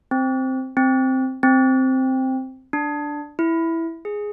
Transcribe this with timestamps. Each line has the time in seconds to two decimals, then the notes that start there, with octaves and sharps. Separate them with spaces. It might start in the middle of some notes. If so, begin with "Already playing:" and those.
0.11 C4
0.77 C4
1.43 C4
2.73 D4
3.39 E4
4.05 G#4